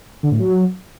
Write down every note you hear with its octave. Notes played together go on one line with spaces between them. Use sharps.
D3
A2
F#3